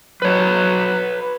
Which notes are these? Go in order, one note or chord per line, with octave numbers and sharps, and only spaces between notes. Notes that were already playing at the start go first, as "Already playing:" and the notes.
F#3 B4 C#5